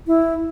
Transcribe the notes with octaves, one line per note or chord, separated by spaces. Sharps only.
E4